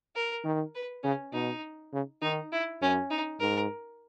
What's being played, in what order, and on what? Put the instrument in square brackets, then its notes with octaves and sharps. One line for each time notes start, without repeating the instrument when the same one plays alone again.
[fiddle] A#4
[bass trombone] D#3
[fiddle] B4
[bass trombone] C#3 [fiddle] C#4
[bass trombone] B2 [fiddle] D#4
[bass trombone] C#3
[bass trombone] D#3 [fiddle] D#4
[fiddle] E4
[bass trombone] F#2 [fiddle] C#4
[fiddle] D#4
[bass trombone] G#2 [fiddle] A#4